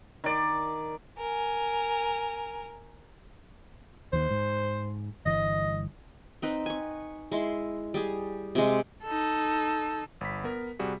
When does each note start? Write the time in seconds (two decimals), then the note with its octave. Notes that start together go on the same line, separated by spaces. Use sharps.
0.24 D#3 D5
1.18 A#4 G#5
4.13 D#2 D#3 C5
4.31 G#2
5.26 G1 E3 D#5
6.42 C4 D#4 B4
6.66 G#5 C#6
7.31 G#3 E4 C6
7.94 G3 G#4
8.55 C3 G#3
9.04 D#4 A4
10.21 G1 B5 B6
10.44 B3 A#4
10.79 C3 G3 F#4 G#4